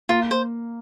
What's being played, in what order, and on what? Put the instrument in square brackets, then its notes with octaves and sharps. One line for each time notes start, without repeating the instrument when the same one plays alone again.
[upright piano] A#3 [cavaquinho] F4
[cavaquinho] C5